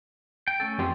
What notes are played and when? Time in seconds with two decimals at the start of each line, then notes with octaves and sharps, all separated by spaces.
0.48 G5
0.60 A3 C#4 A4
0.78 F2 G4 C6